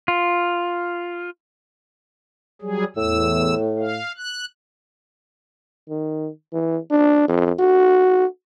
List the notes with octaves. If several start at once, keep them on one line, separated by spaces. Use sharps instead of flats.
F4
F#3 G3 G#4
E2 A2 E6
F5
F#6
D#3
E3
D4
F2
F#4